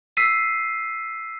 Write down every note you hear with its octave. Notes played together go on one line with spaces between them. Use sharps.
E6 B6 C7 D#7